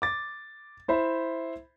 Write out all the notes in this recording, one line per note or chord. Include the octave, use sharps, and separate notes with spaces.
D6 A6
E4 C5 E5 B5